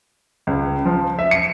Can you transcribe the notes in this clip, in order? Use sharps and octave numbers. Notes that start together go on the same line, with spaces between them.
C#2
F3
E5
C#7